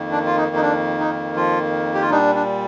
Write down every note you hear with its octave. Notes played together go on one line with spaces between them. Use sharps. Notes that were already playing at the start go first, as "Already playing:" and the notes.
Already playing: F2 D#3 A#3
D4
F4
D#4
D#4
D4
D#4
F3 F4
G4
F4
A#2 G3 D4 D#4
D4